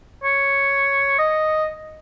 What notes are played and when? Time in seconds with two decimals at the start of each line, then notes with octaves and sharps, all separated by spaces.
0.24 C#5
1.19 D#5